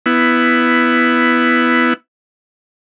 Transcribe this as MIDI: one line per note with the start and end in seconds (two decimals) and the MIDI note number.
0.06 1.94 59
0.06 1.94 64